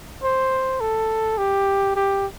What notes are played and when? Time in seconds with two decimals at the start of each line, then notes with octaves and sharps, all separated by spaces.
0.23 C5
0.80 A4
1.38 G4
1.96 G4